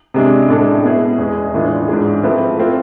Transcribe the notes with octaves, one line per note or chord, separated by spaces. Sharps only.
C3 G#3 D4
A2 G#3 D4 A4
B2 B3 E4 G#4
E2 B2 G#3
A2 E3 G#3 D4 F4
G#2 G#3 D4 G#4
F3 A3 C4 E4 B4
A3 C4 F4